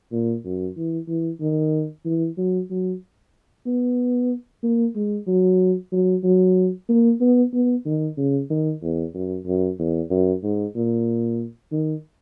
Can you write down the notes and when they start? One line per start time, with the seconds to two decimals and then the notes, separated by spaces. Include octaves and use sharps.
0.12 A#2
0.45 F#2
0.77 E3
1.08 E3
1.41 D#3
2.05 E3
2.38 F#3
2.70 F#3
3.66 B3
4.63 A#3
4.96 G#3
5.28 F#3
5.93 F#3
6.24 F#3
6.89 A#3
7.21 B3
7.53 B3
7.86 D#3
8.17 C#3
8.50 D#3
8.83 E2
9.14 F#2
9.46 F#2
9.79 E2
10.11 F#2
10.43 G#2
10.76 A#2
11.72 D#3